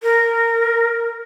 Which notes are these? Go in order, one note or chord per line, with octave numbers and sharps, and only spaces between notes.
A#4